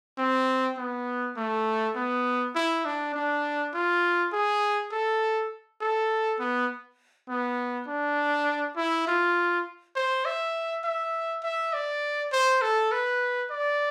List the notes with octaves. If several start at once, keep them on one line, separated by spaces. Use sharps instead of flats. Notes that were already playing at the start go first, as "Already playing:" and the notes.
C4
B3
A3
B3
E4
D4
D4
F4
G#4
A4
A4
B3
B3
D4
E4
F4
C5
E5
E5
E5
D5
C5
A4
B4
D5